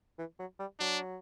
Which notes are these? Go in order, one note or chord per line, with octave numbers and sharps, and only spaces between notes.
E3
F#3
G3
F#3 D4